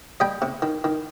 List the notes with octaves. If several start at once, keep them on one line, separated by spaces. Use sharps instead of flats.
G3 D#5 G5
C3
D#3
D#3